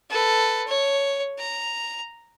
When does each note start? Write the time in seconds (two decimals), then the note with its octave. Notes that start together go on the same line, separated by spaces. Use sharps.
0.10 A4 B4
0.67 C#5
1.38 A#5